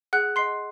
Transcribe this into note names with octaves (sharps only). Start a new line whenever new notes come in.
G#4 F#5 F#6
D#5 F#5 C6 C7